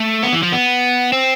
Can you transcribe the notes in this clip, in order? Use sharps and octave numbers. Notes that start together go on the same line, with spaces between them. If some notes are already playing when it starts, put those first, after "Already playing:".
Already playing: A3
B3
E3
F3
B3
C4